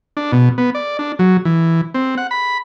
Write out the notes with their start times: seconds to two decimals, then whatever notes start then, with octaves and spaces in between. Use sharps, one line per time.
0.17 D4
0.32 B2
0.58 B3
0.75 D5
0.99 D4
1.19 F#3
1.45 E3
1.94 C4
2.17 F#5
2.31 B5